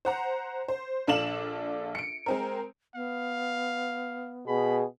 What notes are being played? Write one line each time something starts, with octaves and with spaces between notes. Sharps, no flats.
C5 F#5 A#5
C5
A#1 D4 A4 F5 E7 F#7
C#7 D7
G#3 C4 A#4
B3 F5
B2 G#4 B5